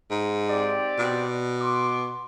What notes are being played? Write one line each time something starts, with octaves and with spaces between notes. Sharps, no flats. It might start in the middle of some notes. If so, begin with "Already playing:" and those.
G#2
C4 G4 D5
B2
C6 D6